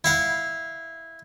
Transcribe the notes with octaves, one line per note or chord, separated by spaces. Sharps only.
E4 F5 F#5